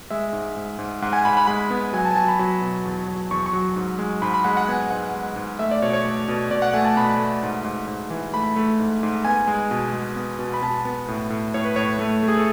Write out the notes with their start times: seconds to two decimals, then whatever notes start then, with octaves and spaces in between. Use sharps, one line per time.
0.10 G#3 E5
0.33 G#2
0.57 G#2
0.79 G#2
1.02 G#2 F#5
1.13 G#5
1.25 G#2 B5
1.37 B5
1.47 G#3 B5
1.70 B3
1.93 F#3 G#5
2.05 A5
2.11 G#5
2.16 F#3 A5
2.28 B5
2.39 F#3 B5
2.62 B2
2.85 E2
3.08 F#3
3.31 E2 C#6
3.46 C#6
3.53 F#3
3.76 G#2
3.99 G#3
4.22 G#2 B5
4.34 B5
4.44 G#3 F#5
4.57 F#5
4.68 B3 G#5
4.90 G#2 F#5
5.14 G#3
5.36 G#2
5.59 A3 E5
5.71 D5
5.82 B2 C#5
5.93 C#5
6.05 A3
6.28 B2
6.51 B2 D5
6.62 F#5
6.74 A3 G#5
6.85 A5
6.97 B2 B5
7.19 A3
7.43 G#2
7.64 G#2
7.88 G#2
8.10 E3
8.34 A3 B5
8.56 A3
8.79 G#2
9.03 G#2
9.25 B3 G#5
9.47 G#3
9.71 B2
9.93 G#3
10.16 B3
10.39 B2
10.54 B5
10.62 B2 A5
10.85 B3
11.08 A2
11.30 A2
11.54 A2 C#5
11.65 B4
11.76 A2 C#5
11.99 A3
12.23 A3
12.28 G#4
12.37 A4